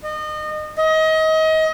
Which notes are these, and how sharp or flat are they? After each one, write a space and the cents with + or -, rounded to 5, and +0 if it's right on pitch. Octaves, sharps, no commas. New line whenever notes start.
D#5 -30
D#5 +30